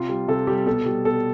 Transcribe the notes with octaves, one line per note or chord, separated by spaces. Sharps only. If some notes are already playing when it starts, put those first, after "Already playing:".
Already playing: C3 F4
G3
C3 A4
G3 G4
B2 A4
G3
B2 A4